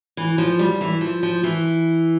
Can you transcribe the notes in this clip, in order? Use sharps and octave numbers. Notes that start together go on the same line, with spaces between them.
E3
F3
G3
E3
F3
F3
E3